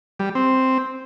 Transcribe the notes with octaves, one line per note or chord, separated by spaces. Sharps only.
G3
C4